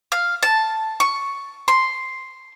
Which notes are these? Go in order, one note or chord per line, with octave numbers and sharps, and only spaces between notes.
F5
A5
C#6
C6